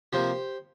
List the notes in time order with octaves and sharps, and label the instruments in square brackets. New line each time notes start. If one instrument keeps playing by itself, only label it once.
[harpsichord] C3 F3 A#3 G4 C5